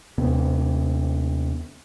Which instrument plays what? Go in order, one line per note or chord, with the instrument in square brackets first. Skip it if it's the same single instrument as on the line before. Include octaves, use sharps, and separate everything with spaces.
[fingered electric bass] D#2 C3 B3